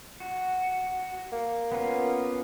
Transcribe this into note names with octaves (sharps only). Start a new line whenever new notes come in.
F#4
A#3
B3 C#4 F4